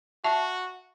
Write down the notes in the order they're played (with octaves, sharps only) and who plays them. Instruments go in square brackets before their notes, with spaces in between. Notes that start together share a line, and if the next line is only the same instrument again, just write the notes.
[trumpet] F#4 [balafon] E5 A5 C#6